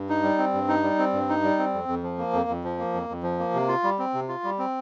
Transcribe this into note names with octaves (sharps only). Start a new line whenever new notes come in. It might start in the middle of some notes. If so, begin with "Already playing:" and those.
Already playing: G2
D#4
G3
C4
G2
D#4
G3
C4
G2
D#4
G3
C4
F2
F2
F3
A#3
F2
F2
F3
A#3
F2
F2
F3
A#3
C3
F4
G3
C4
C3
F4
G3
C4